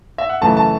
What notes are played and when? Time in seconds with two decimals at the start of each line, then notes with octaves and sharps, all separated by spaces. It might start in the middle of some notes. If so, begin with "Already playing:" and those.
0.18 E5
0.29 F#5
0.41 F#2 C#3 E3 A3 A5
0.57 A5